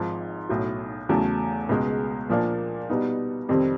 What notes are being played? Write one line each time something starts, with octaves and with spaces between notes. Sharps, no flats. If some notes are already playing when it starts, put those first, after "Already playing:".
Already playing: G#1 G#2 F3
B1 A2 F#3
E2 C#3 F#3 A3
C#2 B2 G#3
A#2 F3 A#3 D4
B2 G3 B3 D#4
F2 C3 D#3 G3 C4